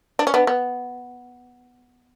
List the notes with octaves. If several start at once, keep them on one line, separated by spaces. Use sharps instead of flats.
D4
C#4
B3 D4
B3